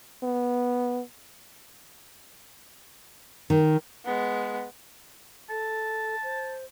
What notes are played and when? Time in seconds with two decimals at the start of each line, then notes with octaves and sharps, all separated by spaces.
0.22 B3
3.50 D#3
4.05 G#3 B3
5.50 A4 A5
6.23 C5